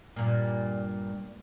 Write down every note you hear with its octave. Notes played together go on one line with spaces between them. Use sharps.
G2 A#2